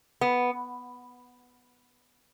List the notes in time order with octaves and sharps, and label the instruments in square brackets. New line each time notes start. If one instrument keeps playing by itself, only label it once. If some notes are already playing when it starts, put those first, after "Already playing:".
[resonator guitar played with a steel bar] B3